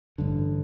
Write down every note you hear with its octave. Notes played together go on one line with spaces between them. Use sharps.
A1 G2 D3